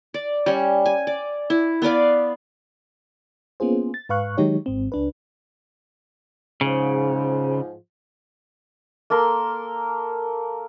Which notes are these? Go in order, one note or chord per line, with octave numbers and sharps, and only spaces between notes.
D5
G3 C#4
G#5
D5
E4
B3 B4 D5 F5
A#3 B3 C#4 F4 G#4 C5
A6
G#2 B4 F5 C#6 F#6
D#3 F#3 G#3 D#4 G4 C#5
G#1 G#2 C4
C#2 D4 B4
G#2 C#3 F3
A#3 A4 A#4 C6